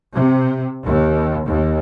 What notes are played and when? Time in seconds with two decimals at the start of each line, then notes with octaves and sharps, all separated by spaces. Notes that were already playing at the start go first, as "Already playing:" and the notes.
0.14 C3
0.82 D#2
1.46 D#2